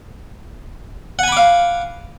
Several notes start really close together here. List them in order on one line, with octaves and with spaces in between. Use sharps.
F#5 G#5 B5 D6 F5